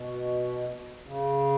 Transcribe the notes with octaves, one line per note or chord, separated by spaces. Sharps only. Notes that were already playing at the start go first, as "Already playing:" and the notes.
Already playing: B2
C#3